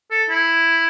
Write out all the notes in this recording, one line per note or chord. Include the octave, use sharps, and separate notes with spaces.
A4
E4